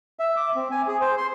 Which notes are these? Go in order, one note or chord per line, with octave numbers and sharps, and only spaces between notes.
E5
D6
C4
G#5
G#4
C5
C6